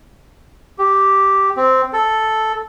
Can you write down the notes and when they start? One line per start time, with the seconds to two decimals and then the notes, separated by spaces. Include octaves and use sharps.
0.79 G4
1.57 C4
1.93 A4